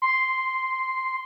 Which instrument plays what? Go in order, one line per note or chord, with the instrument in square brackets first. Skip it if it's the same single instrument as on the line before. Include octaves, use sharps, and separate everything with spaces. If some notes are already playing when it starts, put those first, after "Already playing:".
[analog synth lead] C6